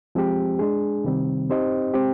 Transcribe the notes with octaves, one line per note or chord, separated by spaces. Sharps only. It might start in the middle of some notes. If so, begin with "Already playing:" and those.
F3 G#3 C4 G4
G#3 D4 G#4
C3 D#3 G3 C4
C4 D#4 G4 C5 D#5
G#3 C4 G4